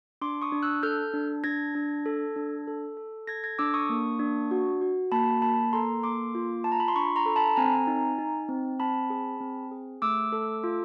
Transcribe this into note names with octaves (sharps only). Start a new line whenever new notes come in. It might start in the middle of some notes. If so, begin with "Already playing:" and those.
D4 C6 D6
C#6 D#6
D4
E6 F#6
A4 F6 G6
D4
D4 G#6 A#6
D4
A4
D4
A4
A4
A4 G#6 A#6
G#6 A#6
D4 D6 E6
C#6 D#6
A#3
D4
F#4
F#4
A#3 A5 B5
A#3 A5 B5
A4 A#5 C6
A#3 C6 D6
F4
F4 A5
A#5
B5
C6
D4 B5 C#6
A#5 C6
A4
A5 B5
C4 G#5 A#5
D#4
D#4
C4
C4 A5 B5
G#4
C4
G#4
A3 D6 E6
A4
F4